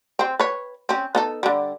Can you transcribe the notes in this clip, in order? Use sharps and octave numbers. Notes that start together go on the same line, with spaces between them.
C4 C5
B4 C#5
C4 C#4
B3 D#4 A4
D3 G3